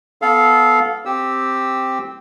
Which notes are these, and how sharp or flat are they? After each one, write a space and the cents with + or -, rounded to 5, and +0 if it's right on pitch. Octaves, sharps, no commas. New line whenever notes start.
B3 +0 A4 -20 F5 +0
C4 +0 G4 +0 E6 -15